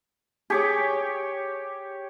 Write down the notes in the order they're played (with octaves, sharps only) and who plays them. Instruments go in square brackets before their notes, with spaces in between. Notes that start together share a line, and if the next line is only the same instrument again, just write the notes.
[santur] G4 C#5 D6 [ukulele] G#4